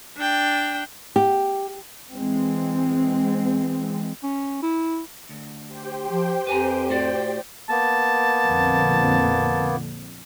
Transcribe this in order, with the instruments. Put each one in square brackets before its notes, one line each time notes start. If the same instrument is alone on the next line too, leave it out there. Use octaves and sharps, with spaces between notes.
[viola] D4 G5
[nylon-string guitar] G4
[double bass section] E3 G#3 C4
[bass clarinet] C#4
E4
[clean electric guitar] D2
[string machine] G4 C5 G5
[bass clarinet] F3
[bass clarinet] F2 [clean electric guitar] B4 G#5 A#5
[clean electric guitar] A2 F#4 D5
[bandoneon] A#3 B3 [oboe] A5
[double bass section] A#1 F2 D3